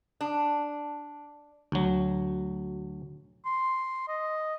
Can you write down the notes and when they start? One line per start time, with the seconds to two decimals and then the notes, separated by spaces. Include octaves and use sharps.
0.21 D4
1.72 D2 F#3
3.45 C6
4.08 D#5